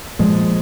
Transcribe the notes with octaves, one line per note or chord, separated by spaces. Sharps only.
A#2 F3 G#3